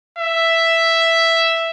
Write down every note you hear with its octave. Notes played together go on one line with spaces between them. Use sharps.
E5